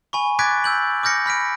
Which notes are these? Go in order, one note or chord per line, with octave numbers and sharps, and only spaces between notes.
G#5 B5 C#6
D6 F#6 G#6 A6 B6 D7
E6 G6 F#7
D6 F6 G6 A#6 C#7
B5 F6 B6 D7